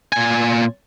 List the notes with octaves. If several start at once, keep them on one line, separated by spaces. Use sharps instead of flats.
A#2 G#5